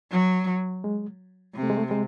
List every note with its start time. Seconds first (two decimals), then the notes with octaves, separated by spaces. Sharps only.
0.12 F#3
0.84 G#3
1.55 C3
1.63 A3
1.70 G#3
1.77 A3
1.91 G#3